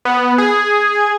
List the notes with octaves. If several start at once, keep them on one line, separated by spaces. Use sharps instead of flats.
B3
G#4